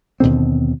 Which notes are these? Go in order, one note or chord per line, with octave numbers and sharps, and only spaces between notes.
D#2 B2 D3 C4